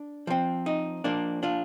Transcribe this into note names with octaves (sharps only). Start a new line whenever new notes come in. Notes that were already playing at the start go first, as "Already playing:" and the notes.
Already playing: D4
F3 C4
D#4
F3 A#3 D4
D4 F4